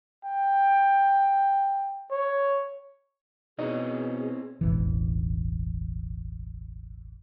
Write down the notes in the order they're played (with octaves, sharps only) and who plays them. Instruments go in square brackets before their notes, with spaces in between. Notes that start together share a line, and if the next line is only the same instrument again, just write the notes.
[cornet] G5
C#5
[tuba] B2 [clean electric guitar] C4 E4 C#5 [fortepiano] D#4 [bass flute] G#4
[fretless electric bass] E1 A1 E3